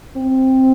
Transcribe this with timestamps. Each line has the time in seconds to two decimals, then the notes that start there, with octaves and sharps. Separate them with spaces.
0.16 C4